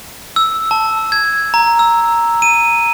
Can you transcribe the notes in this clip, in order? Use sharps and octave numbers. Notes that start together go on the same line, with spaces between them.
E6
A5
G#6
A#5
E6
D#7